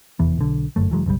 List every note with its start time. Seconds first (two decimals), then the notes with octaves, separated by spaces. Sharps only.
0.19 F1 E2 E3 B3
0.38 B1 D3
0.76 G1 F#2 A3
0.90 F1 E3 F#3 G#3
1.06 F#1 B1 C#3 G3